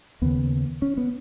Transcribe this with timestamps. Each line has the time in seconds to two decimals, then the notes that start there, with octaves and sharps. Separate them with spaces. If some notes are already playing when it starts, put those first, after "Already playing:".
0.22 D#2 C#3 B3
0.82 C#4
0.97 B3